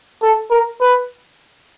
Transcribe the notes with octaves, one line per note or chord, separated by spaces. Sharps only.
A4
A#4
B4